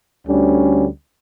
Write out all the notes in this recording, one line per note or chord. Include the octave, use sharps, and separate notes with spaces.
D2 D3 G3 C#4